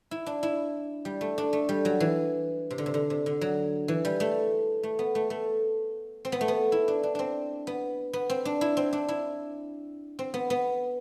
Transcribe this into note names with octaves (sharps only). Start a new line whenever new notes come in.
E4
D4
E4
G3
A3
D4
A3
G3
F#3
E3
C3
D3
C3
D3
C3
D3
F#3
E3
G3
A3
A3
B3
A3
A3
C4
B3
A3
B3
E4
D4
D4
C4 D4
B3
B3
C4
D4
E4
C4
D4
E4
C4
B3
B3